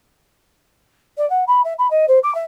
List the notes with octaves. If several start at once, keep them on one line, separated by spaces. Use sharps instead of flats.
D5
F#5
B5
E5
B5
D#5
C5
D6
E5